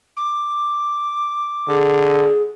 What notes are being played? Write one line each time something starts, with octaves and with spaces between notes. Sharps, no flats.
D6
D3 G#4